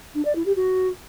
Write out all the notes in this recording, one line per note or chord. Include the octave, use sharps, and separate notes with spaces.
D4
D5
E4
G4
F#4